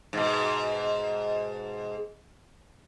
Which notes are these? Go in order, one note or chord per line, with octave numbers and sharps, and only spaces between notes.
G#2 B2